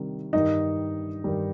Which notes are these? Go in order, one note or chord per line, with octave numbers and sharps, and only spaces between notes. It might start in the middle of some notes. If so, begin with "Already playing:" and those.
Already playing: C3 D#3 G3
G2 D#3 G3 D#4 D#5
G2 D#3 G3